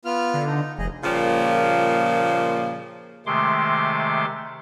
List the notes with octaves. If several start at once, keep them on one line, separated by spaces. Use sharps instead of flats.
B3 F4 F6
D3
D#4
F1 G#4 D#5
A#2 C#3 F3 G3 A#3
C3 D#3 G#3 A3 C6 D6